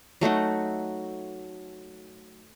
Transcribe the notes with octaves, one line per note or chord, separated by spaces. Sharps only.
F#3 A3 D#4 F#4